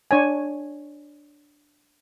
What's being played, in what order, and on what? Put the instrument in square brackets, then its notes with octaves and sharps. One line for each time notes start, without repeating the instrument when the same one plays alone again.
[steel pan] D4 C#5 G#5